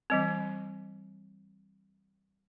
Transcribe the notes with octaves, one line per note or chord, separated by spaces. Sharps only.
E3 G3 C4